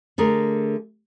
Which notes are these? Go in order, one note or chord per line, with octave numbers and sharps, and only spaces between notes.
D3 A3 G#4 A#4